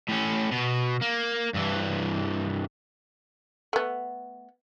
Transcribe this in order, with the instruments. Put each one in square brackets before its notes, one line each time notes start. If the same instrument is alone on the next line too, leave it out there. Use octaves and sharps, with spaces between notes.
[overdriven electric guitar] A2 C#4
B2
A#3
G2 E3
[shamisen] A3 B3